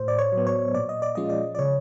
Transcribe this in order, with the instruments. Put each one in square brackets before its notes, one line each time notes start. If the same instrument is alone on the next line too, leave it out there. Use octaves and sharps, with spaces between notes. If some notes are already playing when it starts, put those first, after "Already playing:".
Already playing: [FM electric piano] A2 C5
D5
C#5
F#3
B3
C#5
A#2 D5
D#5
D5
F3 G#3 C#4 F4 D#5
D5
D5
C#3 C#5